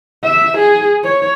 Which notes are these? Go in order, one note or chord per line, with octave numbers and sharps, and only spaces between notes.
E5
G#4
C#5